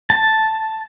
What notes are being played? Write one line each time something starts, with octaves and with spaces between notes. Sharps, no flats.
A5